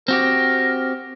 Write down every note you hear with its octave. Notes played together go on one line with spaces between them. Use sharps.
C4 F#4 G4 A#4